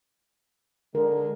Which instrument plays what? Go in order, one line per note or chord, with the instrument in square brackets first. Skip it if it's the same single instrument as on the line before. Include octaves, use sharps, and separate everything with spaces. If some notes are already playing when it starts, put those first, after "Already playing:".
[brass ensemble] D3 G#3 [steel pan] A#4